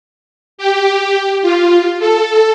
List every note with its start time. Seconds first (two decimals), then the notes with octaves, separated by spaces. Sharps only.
0.58 G4
1.42 F4
2.00 A4